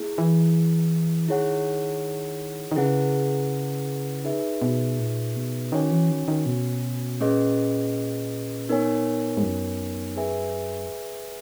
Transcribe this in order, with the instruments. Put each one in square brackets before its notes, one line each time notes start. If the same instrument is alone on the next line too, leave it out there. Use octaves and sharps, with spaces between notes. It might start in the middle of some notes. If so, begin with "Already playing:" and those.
Already playing: [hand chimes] A#3 E4 G#4
[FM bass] E3
[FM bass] D#3 [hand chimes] E4 G#4 C#5 F#5
[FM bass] D#3
[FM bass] C#3 [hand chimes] E4 G#4 B4 F#5
[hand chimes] D#4 G#4 B4 E5
[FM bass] B2
A#2
B2
[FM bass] D#3 [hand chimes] C#4 F#4 C#5 G#5
[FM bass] E3
D#3
D#3
B2
[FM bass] A#2 [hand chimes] A#3 C#4 G#4 B4 D#5
[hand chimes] B3 D#4 A#4 C#5 G#5
[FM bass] G#2
F#2
[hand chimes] G#4 B4 E5 G#5